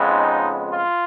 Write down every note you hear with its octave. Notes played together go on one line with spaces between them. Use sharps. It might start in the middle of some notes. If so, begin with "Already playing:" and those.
Already playing: F2 C#3 G#3 B3
D#4
F4